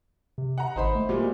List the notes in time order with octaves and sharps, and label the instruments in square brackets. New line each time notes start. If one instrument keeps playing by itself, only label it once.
[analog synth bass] C3
[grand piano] F#5 A#5
[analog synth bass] G#1 [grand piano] D#4 C5 B5
[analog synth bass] A3
[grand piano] A#2 F#3 G3